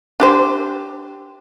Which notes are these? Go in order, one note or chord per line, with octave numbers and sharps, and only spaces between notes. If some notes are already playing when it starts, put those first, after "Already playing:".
D4 G4 C5